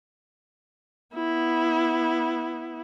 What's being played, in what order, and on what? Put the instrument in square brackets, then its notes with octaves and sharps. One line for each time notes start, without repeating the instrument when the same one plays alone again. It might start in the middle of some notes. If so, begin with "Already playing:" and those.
[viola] B3 E4